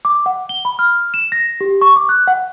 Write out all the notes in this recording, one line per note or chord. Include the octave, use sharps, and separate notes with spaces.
D6
F#5
G7
B5
F6
E7
A#6
G4
C#6
D6
F#6
F#5